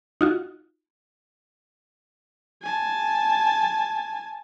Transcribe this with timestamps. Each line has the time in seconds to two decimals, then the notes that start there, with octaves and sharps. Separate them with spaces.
0.21 D#4 F4 F#4
2.63 G#5 A5